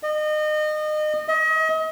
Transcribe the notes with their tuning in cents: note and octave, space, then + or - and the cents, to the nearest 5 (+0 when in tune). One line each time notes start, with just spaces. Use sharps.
D#5 -30
D#5 +35